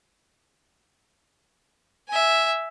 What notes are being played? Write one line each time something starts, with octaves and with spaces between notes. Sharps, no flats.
E5 G#5